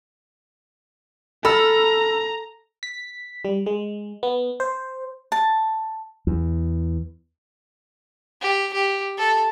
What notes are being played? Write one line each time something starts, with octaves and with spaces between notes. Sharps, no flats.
A4 A#5 B5 E6 F6
B6
G3
G#3
B3
C5
A5
E2
G4
G4
A4